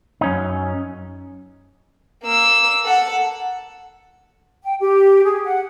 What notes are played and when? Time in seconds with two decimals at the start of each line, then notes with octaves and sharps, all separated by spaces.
0.21 F#2 C#4 D#4
2.23 A#3 E6
2.84 A4 F#5
4.64 G5
4.80 G4
5.24 G#4
5.45 F#5